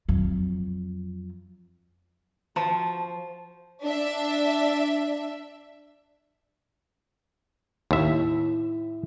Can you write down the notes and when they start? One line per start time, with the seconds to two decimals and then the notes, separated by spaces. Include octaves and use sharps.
0.09 F2 F#3
2.56 F3 F#4 A5
3.82 D4 E5
7.91 D#2 A2 E5